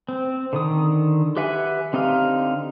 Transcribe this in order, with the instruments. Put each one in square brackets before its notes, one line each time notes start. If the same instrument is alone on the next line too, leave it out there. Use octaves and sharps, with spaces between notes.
[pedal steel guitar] C4
D3 D#3 D#6
G4 B4 E5 F#5 G#5
D3 C4 D#4 G4 F5